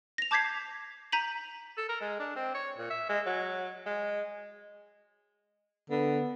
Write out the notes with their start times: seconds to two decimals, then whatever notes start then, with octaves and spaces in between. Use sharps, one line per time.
0.18 A#6 F7
0.31 A5 D6 G6 G#6 B6 C7
1.12 A#5 G6 B6 D#7 F7 F#7
1.77 A4
1.89 A#4
2.01 G#3
2.20 D4
2.36 C4
2.54 C#5
2.78 A#2
2.90 E5
3.09 G#3
3.26 F#3
3.86 G#3
5.90 D3 B3